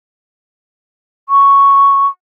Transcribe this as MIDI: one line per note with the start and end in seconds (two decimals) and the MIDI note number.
1.29 2.07 85